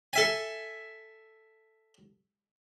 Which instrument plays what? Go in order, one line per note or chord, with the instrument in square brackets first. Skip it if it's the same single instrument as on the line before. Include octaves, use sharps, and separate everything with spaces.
[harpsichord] A4 E5 G#5